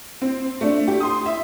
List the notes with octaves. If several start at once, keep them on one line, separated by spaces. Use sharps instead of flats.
C4
A3 D4
G4
C6 D#6
E5